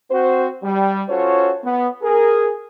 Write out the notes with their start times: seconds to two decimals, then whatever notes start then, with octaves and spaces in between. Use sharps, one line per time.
0.10 C4 F#4 C5
0.63 G3
1.09 C#4 F4 F#4 A4 C5 C#5
1.64 B3
2.02 G#4 A#4